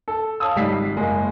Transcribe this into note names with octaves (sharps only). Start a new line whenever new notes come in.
A4
C#5 F5 A5 D#6 E6
G#1 C#2 G3 D#4 B6 C7
F#1 G#3 A#3